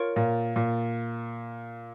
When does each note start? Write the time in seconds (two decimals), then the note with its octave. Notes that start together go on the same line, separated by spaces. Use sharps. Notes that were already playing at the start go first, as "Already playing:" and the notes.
Already playing: F4 A#4 C#5
0.16 A#2
0.56 A#2